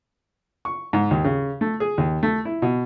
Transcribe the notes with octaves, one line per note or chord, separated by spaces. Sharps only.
C#6
G#2
D#2
C#3
A3
G#4
D#2
A3
E4
B2